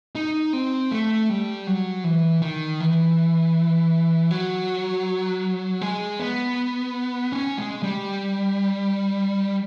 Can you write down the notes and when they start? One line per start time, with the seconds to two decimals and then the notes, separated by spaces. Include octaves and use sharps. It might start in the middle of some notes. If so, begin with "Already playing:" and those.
0.15 D#4
0.53 C4
0.91 A3
1.29 G3
1.67 F#3
2.04 E3
2.42 D#3
2.80 E3
4.31 F#3
5.81 G#3
6.20 B3
7.32 C#4
7.58 G#3
7.83 G3